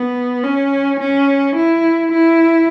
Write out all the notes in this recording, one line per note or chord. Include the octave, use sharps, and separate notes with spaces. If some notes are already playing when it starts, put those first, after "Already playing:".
Already playing: B3
C#4
C#4
E4
E4